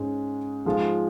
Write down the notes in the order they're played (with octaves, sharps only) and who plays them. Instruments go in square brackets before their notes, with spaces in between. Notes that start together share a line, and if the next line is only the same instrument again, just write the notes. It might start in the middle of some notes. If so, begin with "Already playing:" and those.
Already playing: [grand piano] G#2 G#3 C#4
G#2 F3 G#3 F4